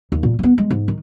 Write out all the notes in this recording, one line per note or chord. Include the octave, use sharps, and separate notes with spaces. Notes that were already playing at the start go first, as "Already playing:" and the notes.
D#2
A#2
A3 B3
G#3
G#2
D#3